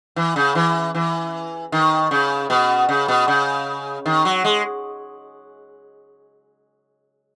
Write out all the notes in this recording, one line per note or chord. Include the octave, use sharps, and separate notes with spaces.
E3
C#3
E3
E3
D#3
C#3
B2
C#3
B2
C#3
D#3
F#3
G#3